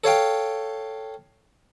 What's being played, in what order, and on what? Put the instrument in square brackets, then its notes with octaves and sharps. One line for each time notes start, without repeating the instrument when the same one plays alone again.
[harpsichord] A4 C#5 F5 G5